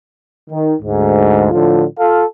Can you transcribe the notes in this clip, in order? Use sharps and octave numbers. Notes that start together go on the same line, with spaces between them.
D#3
D2 G#2
A2 D3 F3 F4
F4 A4 F5